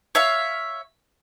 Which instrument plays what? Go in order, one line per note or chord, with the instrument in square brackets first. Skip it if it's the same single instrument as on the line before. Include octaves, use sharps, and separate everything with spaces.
[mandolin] C#5 E5 F5